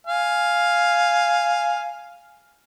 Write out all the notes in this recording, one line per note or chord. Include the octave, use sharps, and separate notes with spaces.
F5 G#5